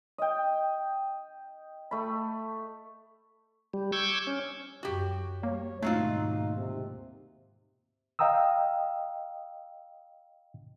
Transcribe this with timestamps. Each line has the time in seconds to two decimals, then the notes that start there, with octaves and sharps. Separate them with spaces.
0.18 D#5 G5
1.91 A3 B5
3.74 G3
3.92 C#6 D6 E6 G6 G#6
4.27 C#4
4.83 F#2 F#4 G4
5.43 G3 A#3 C#5
5.83 D#2 G#2 B2 F#3 A3 C4 D#4 F4
6.57 C3
8.19 D#5 F5 G5 A#5 D#6 E6